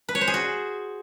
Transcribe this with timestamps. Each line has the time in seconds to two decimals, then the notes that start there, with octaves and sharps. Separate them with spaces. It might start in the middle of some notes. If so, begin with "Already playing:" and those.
0.09 B4
0.15 C#5
0.21 C5
0.28 G#4
0.34 F#4